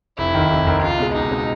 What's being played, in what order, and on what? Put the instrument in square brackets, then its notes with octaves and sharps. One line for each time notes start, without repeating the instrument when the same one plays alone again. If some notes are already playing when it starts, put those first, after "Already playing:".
[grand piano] F1 [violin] E4
[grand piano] D#2 D#3
F1
D#2 D#3
[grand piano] C#2 [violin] F4
[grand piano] B2 G#3
[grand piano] C#2 [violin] D#4
[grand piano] B2 G#3